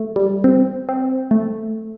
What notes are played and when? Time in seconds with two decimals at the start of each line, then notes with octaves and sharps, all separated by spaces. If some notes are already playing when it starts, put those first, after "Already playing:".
Already playing: A3
0.16 G3
0.44 C4
0.89 C4
1.31 A3